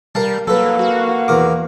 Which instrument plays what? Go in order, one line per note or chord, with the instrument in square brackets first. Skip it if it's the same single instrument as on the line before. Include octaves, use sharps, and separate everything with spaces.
[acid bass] G3 [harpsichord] A#4 F5 A5
[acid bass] F#3 [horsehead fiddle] A#3 F5 [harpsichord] A4 B4
[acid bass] F#4
[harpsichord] E2 A#4 D6